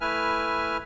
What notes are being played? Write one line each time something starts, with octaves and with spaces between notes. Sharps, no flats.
A3 E4 B4 E5 G#5 F6